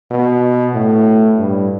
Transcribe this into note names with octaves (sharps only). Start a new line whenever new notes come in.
B2
A2
G2